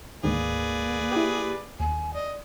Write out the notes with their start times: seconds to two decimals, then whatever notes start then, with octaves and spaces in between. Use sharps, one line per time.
0.23 D2 G#2 D#3 A#3 G#4 B4 D5
1.12 E4 G4
1.80 D#2 G#5
2.14 D5 D#5